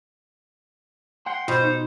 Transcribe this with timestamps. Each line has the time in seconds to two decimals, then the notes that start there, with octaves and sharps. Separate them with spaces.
1.26 F#5 G5 C6
1.48 B2 F4 C5
1.64 D#4